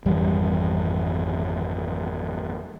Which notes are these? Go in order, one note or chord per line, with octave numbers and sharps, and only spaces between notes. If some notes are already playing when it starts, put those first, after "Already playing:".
G#1 F2 E3 G3